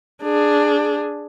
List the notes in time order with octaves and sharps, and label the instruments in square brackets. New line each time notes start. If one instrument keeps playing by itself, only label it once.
[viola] D4 G#4